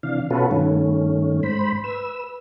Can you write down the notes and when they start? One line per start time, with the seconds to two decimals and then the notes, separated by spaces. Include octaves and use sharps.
0.03 C3 E3 D4 F5
0.31 B2 C#4 F4 F#4 A4 B4
0.51 G2 D#3 A3 C#4
1.43 G#2 C5 B5
1.84 B4 E6